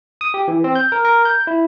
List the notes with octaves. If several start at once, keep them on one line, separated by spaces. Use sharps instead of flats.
D#6
G4
E3
C4
G6
A#4
A#4
G6
E4